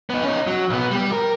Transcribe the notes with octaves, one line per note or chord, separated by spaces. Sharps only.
B3 D#4
C#4 D#4
F#3
B1 B3
G3 G4
A#4